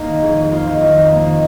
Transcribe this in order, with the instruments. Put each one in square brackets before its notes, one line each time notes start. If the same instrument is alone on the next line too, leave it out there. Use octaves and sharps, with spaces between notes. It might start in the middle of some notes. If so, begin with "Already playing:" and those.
Already playing: [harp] A#3 D#4
D#3
F2 G#4
F2 G#4
A#3 F4
D#3 C4
F2 D#4
F2
A#3
D#3